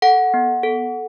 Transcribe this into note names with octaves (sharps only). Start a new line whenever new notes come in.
A4 F#5
B3
A4